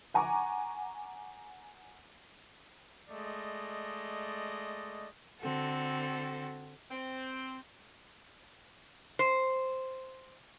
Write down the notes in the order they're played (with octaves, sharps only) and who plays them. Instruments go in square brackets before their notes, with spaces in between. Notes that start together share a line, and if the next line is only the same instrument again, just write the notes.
[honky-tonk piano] F#5 G#5 A#5 C#6 D6
[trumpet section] G#3 A3 D5 D#5
[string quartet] D3 C4 F#4 A4
[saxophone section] C4
[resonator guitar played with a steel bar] C5